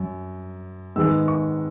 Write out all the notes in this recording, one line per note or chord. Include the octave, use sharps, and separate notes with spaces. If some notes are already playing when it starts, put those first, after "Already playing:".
Already playing: F#2
G#2 D#3 G#3 B3 E6
C#6